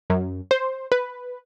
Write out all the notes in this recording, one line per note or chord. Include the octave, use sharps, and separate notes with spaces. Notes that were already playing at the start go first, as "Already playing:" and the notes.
F#2
C5
B4